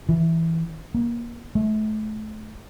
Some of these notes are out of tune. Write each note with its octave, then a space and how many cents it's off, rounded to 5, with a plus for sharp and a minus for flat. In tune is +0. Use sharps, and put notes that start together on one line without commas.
E3 -5
A#3 +25
A3 -35